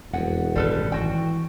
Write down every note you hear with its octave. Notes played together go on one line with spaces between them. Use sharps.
E1 F2 F#5
G#1 F#2 A2 G3 A4 B4
E3 F#4 G5